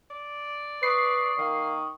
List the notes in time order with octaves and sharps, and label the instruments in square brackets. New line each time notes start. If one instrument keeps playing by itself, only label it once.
[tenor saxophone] D5
[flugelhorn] B4 [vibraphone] C#6 D#6 [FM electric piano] C7
[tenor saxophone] D#3 [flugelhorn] A#3